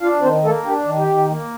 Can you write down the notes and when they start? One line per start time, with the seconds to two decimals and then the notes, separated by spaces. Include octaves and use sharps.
0.01 D4 F4 F5
0.21 D#3 C4 C5
0.43 A3 A#3 A4
0.64 D4 G4
0.85 D#3
0.97 G4
1.07 D#3
1.29 A#3